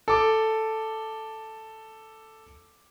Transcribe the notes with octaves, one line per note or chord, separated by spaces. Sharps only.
A4 D6